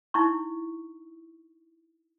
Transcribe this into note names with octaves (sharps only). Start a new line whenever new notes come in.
D#4 E4 C#6